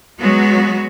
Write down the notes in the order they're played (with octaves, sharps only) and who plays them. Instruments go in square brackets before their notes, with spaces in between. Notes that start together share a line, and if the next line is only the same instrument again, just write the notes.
[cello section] F#3 G#3 B3 F#4